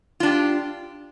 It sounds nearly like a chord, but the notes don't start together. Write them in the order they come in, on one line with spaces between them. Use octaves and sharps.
F4 D4 G4